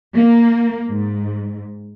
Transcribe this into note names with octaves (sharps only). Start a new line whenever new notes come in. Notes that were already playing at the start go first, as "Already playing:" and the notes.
A#3
G#2